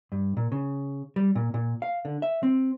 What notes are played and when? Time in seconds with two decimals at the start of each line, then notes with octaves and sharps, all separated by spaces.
0.12 G2
0.37 A#2
0.52 C#3
1.16 G3
1.35 A#2
1.54 A#2
1.82 F5
2.05 D3
2.22 E5
2.43 C4